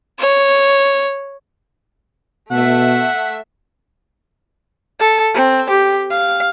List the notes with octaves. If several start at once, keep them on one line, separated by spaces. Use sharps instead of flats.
C#5
B2 A3 E5 F#5 B6
A4
C4
G4
F5